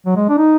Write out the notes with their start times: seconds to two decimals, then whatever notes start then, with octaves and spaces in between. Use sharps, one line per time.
0.06 F#3
0.16 G#3
0.29 D4
0.38 D#4